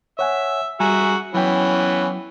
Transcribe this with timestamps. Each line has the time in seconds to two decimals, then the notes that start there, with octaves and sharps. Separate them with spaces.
0.19 C#5 E5 F#5 G#5
0.80 G3 F#4 G#4 E5 G#5 A#5
1.34 E3 F#3 B3 C#4 G5